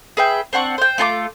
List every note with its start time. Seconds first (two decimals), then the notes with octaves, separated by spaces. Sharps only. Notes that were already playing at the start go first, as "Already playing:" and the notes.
0.17 G#4 B4 E5 G5
0.53 C4 D4 F#5 C#6
0.78 C5 G5
0.98 A3 F4 A5 D6